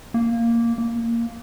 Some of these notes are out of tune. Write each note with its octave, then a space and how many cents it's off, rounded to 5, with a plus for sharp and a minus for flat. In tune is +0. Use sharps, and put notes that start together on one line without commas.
A#3 -5
A#3 -5